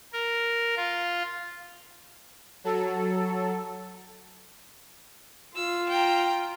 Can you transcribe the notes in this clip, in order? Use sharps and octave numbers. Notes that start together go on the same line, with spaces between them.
A#4
F4
F#3 A4
F4 E6
G5 A#5